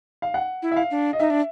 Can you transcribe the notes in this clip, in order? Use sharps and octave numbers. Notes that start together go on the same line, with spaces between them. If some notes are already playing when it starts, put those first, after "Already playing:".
F5
F#5
E4
E5
F5
D4
D#5
D#4 E5
D4